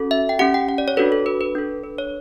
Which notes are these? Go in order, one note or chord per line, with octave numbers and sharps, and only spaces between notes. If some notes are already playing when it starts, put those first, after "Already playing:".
Already playing: C#4 F#4 A4
E5
G5
C#4 G4 F#5
G5
F#5
D5
C#5
D4 F#4 A4 B4
A4
B4
B4
D4 A4
B4
C#5